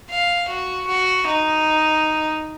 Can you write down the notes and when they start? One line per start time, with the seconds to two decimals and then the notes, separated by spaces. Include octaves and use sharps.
0.10 F5
0.49 F#4
0.88 F#4
1.27 D#4